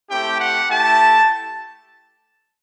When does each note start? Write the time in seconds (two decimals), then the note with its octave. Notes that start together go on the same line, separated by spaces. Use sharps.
0.10 A3 C4 E4 G4 G5
0.40 F#5
0.70 A3 E4 G4 A5